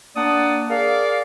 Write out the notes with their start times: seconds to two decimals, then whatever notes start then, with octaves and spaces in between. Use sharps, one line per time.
0.16 A#3 D4 D5 F#5 A5 D#6
0.70 G#4 A#4 D5 F5